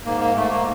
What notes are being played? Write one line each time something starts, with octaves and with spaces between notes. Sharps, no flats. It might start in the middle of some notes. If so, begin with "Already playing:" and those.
G#2 A#3
A#3
G#2 A3
A#3